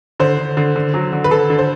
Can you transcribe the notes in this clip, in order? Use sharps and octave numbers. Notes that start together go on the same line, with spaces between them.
D3 C5
D3
D3
D3
F#3
D3
B4
D3 A4
D3
C5